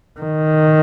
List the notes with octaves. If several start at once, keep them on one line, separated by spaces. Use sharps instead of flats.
D#3